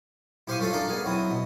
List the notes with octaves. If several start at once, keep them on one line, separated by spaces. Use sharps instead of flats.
E4 G4 C5 F5 C#6 D#6
A3 C#4 F4 A4 F5
D4 D#4 A4 A#4 F5
B3 G#4 F5
F#3 C4 E4 D#6
B2